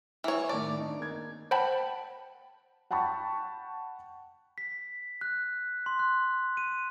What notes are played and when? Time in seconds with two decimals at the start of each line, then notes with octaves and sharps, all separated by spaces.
0.24 E3 C#5
0.49 A2 D#3 D5 A5
0.79 D4 D#4
0.99 A#3 G#6
1.51 C5 F#5 G5 A5 B5
2.91 F#5 G5 A5 B5 C#6
4.58 B6
5.21 F#6
5.86 C6
5.99 F#6
6.57 D#7